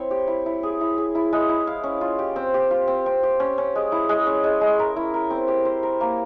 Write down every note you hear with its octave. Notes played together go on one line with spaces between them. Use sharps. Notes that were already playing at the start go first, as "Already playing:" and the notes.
Already playing: C4 E4 C#5
G4
E4
E4
G#4
E4
G#4
E4
G#3
E4
F5
C#4
F4
G4
C4
G4
F4
C4
C4
G4
C#4
C#4
G#3
E4
G#3
C#4
G#3
G#3
A#4
E4
A#4
C4
G4
C5
A#4
A#3